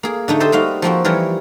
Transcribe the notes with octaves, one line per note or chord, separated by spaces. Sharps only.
A#3 G#4
D3 A3 D#4
G4 A4 C5 D#5 A5
G3 A#3 D#4 F#4 F5
F3 A#3 C4 F#4
E3 F3 G3 A#4 C#5